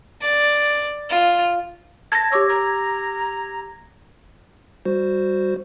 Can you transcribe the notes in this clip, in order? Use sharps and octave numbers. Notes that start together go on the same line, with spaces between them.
D5
F4
A5 G#6 A#6
G4 C#5 D6 E6
A#5
G3 F#4 C5